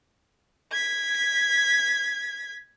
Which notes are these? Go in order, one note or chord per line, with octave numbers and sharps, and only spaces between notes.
G#6 B6